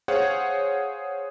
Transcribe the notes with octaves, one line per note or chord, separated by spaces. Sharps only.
G#4 C5 C#5 F5 F#5